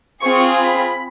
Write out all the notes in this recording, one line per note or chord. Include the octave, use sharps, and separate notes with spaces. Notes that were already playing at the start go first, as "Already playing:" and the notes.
C4 F4 G#4 C#6
B5